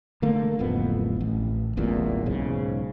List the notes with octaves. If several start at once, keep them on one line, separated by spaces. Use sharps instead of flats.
D3 A3 A#3
D1 A1 F2 B3
A1
D1 A1 E2 A#2
B1 G#2 C#3